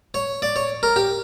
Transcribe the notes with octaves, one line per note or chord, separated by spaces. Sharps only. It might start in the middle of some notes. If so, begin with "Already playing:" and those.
C#5
D5
C#5
A#4
G4